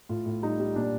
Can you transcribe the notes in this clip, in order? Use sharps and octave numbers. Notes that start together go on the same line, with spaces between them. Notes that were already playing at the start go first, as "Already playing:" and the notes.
A2 F4
A2
G3 D#4
G3
A#2 D4